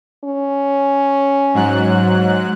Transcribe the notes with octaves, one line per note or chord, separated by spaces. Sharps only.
C#4
G#2 F#3 F#6